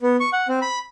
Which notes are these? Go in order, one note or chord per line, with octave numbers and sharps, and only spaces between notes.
B3
C#6
F#5
C4
B5